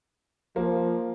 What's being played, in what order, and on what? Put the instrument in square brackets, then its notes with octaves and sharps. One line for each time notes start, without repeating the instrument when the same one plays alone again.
[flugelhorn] F3 [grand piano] A#3